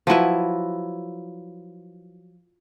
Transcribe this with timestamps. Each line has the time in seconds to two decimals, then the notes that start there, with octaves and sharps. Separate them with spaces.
0.07 F3 F#3 E4 B4